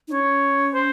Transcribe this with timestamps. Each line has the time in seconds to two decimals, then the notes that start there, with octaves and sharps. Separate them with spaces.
0.08 D#4
0.12 C#4 C#5
0.74 C5